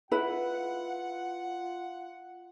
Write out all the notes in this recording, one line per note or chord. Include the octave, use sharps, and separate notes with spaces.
E4 F4 B4 F#5